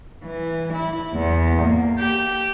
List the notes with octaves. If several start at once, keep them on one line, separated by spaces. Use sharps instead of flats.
E3
E4
E2
A#3
G4